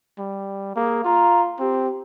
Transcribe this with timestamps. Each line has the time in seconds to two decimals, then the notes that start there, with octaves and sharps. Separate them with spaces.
0.19 G3
0.76 A#3 G#4
1.05 F4 A#5
1.59 C4 G4